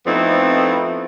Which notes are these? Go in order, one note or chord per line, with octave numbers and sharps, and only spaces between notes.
F2 A3 B3 C4 D#4 E4